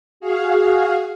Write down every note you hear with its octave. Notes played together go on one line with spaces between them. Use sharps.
F#4 G#4 F5